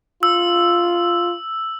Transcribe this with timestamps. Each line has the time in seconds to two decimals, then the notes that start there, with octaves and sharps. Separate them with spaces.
0.23 F4 E6